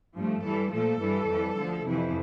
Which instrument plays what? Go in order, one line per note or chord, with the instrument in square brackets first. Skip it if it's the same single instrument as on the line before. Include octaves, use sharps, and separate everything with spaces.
[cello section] G2 F3 A3
G2 E3 G3 A4
A#2 F3 A3 A4
G2 E3 G3
F2 E3 G3
D2 D3 F3
F2 C3 E3 E4